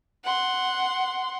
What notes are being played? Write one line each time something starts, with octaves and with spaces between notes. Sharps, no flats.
F#5 C6